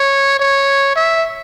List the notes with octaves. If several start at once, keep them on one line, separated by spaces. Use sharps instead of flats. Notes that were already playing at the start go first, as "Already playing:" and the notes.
Already playing: C#5
C#5
E5